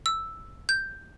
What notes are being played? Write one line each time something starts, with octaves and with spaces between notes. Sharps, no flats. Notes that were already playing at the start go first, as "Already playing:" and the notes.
E6
G6